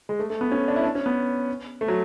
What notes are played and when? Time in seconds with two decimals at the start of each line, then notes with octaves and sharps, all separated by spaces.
0.09 G#3
0.19 A3
0.30 A3
0.41 B3
0.52 C#4
0.68 D4
0.76 E4
0.84 D4
0.95 C#4
1.06 B3
1.81 A3
1.88 F#3